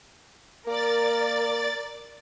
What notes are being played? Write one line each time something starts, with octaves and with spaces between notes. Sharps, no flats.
A#3 A#4 D5 A6